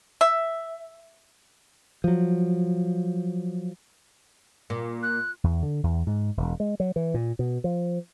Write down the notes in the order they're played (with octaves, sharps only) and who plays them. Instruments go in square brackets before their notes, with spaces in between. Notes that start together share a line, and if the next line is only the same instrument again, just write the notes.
[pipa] E5
[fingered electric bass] F3 F#3
[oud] A#2
[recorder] F#6
[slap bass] E2
D3
E2
G#2
E1
G#3
F#3
E3
A#2
B2
F3